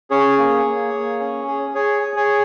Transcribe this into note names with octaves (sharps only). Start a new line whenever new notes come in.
C#4 G#4 C#5
A#3
A#3
A#3
C#4
G#4
G#4 C#5
G#4
G#4 C#5